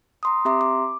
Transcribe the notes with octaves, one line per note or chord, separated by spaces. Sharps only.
A#5 C6 D#6
C4 G4 E5 A#5 C6 D6
D6